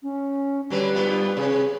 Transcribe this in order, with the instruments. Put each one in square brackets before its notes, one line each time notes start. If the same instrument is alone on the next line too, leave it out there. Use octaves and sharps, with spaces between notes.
[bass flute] C#4
[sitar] D3 F#3 B4 [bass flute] G3
[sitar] G2 B3 F4
[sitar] C3 [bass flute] G#4